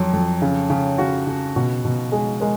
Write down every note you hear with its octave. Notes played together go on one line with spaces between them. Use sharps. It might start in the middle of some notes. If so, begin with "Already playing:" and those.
Already playing: F2 F#3
F2
C#3
C#3
C#3 F#4
C#3
B2 F#4
B2
G#3 G#4
G#3 A#4